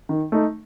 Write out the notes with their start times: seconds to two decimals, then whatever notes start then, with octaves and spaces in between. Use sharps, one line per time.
0.09 D#3
0.32 A3 D#4